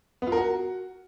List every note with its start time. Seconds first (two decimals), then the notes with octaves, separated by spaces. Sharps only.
0.22 B3
0.27 F4
0.32 A#4
0.37 F#4